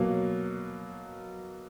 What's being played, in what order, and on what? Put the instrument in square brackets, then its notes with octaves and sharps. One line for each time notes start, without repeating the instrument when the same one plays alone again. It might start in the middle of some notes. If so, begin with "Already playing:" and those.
Already playing: [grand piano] B2 F#3 A#3